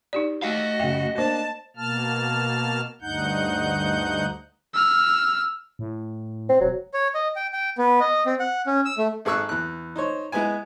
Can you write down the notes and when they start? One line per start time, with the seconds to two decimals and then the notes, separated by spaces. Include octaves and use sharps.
0.13 D#4 G4 D5
0.42 A3 F#4 D#5 F5
0.79 F#2 C#3 E5 G5
1.18 A#3 D4 C5 A5
1.76 B2 A#3 A5 F6
3.02 D2 G2 D#4 F#5 G6
4.74 E6 F6
5.79 A2
6.49 C4
6.61 E1 F#3
6.94 C#5
7.15 D#5
7.36 G5
7.53 G5
7.78 B3
8.00 D#5
8.26 C4
8.40 F#5
8.67 C#4
8.85 E6
8.98 A3
9.25 G#1 G#4 A4 C#6 E6 F#6
9.49 E2 F#6
9.96 D#4 C5 C#5
10.32 G#3 B3 E4 G#5